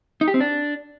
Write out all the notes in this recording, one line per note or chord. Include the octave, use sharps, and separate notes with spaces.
D#4
G4
C4
D4